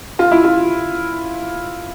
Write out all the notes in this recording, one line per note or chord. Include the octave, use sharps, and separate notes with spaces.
F4
E4
F4